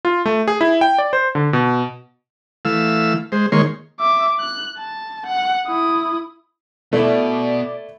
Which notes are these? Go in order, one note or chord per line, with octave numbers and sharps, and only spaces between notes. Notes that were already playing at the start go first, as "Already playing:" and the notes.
F4
A3
G#4
E4
G5
D5
C5
D3
B2
E3 A3 F5 E6
G#3 C5
D#3 G#3 A#3 C#5 C6
E5 D6
F#6
A5
F#5
E4 D#6
B2 A3 E4 D5